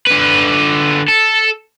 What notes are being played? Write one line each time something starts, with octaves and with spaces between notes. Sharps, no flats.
D3 B4
A4